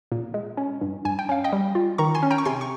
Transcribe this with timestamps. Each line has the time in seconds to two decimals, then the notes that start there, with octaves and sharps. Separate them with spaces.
0.12 A#2
0.34 G#3
0.57 C#4
0.81 G2
1.05 G2 G#5
1.19 G5
1.29 C#4 F5
1.44 D#5 G5
1.53 G3
1.75 F4
1.98 D#3 A#5 C#6
2.14 G#5 C6
2.23 C#4
2.30 G5 A#5
2.38 C#6
2.45 C3 G#5 C6
2.61 C#6